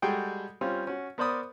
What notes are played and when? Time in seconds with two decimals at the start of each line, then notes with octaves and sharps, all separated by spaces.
0.02 G3 G#3 F#4 G#4 A4 G5
0.61 G3 C4 C#4 F4
0.87 C#4 F#4
1.18 B3 A#4 C5 D5 B5 D#6